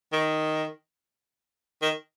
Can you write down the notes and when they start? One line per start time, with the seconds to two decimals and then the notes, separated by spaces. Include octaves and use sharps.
0.13 D#3
1.82 D#3